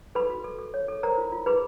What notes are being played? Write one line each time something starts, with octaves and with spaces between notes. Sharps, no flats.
A4 B4 B5
F#4
A4
A4
C#5
A4
A#4 C5 A#5
F4
F4
G#4 B4 B5